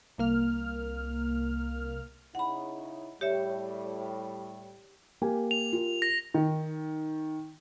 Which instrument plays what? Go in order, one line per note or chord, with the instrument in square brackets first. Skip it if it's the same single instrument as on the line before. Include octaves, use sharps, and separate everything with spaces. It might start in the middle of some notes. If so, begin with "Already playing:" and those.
[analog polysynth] C2 A#3 F6
[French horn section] C#3 D#4 E4 [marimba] F#5 B5
[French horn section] A2 G3 [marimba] G4 C#5 E5
[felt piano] A#3 G4 G#5
[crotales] F7
[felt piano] F4 G4 A#4
[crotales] A#6
[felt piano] D#3